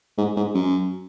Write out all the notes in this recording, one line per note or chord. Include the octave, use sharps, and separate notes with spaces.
G#2
G#2
F#2